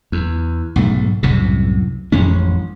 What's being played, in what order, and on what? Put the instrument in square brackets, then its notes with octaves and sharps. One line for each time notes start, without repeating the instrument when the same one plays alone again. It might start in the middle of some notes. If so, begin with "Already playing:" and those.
[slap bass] E2
B1 G#2 A3
C2 F#2 A2 C3
A1 F2 G#3 C#4